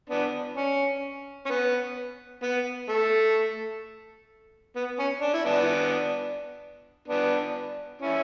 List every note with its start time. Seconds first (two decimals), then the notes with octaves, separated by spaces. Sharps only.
0.10 B3 D4
0.57 C#4
1.46 C#4
1.49 B3
2.43 B3
2.89 A3
4.76 B3
5.00 C#4
5.22 D4
5.34 E4
5.45 B3 D4
7.08 B3 D4
8.01 C#4 E4